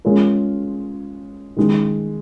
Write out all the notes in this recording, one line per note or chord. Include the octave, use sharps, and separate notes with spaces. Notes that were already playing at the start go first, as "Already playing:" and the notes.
G#3 C#4 F4 A#4
D#3 G#3 D#4 G#4